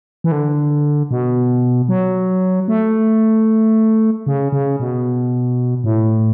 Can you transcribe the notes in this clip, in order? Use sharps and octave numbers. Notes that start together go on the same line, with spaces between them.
E3
D3
B2
F#3
A3
C#3
C#3
B2
A2